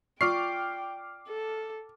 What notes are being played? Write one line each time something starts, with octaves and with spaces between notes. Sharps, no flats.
F4 D5 G5 C#6 D6 F6 C7
A4